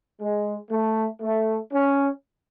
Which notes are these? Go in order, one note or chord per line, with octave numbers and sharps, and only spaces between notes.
G#3
A3
A3
C#4